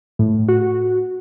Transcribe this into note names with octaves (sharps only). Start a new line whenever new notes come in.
A2
F#4